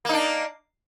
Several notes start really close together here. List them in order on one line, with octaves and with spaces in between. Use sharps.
A#3 D#4 D4